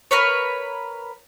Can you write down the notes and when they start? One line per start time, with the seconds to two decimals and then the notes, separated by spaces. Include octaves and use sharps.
0.11 A#4 B4 C#5